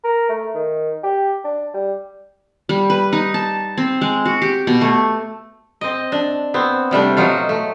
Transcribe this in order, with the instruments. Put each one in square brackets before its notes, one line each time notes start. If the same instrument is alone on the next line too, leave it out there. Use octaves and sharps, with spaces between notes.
[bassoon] A#4
A3
D#3
G4
D4
G3
[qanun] G3
B4
D#4
A5
C4
G#3
F#4
G4
B2
A3
[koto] C4 D#5
D4
B3 C4
C3 G3 A3 D4
B2 F#3 D#4 F4
A3